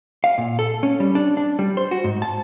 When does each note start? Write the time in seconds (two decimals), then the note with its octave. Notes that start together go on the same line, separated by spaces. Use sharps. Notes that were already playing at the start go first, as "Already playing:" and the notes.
0.24 F5
0.38 A#2
0.59 A4
0.83 C#4
1.00 G3
1.15 D4
1.37 D4
1.59 G3
1.77 C5
1.91 F#4
2.04 G#2
2.22 A5